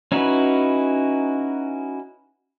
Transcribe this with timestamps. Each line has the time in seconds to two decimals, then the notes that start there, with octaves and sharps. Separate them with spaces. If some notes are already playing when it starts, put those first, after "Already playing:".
0.12 C#4 D#4 E4 F#4 B4